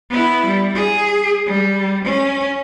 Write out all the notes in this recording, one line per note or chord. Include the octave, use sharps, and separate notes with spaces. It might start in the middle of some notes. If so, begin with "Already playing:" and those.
B3 E4
G3
G#4
G3
C#4